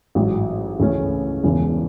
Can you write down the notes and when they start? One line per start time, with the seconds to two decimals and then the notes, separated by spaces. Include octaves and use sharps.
0.15 A1 G#2 F#3
0.80 C#2 C#3 E3 A3 C#4
1.43 E1 E2 C#3 E3